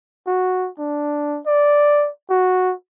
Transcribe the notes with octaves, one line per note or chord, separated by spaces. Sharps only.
F#4
D4
D5
F#4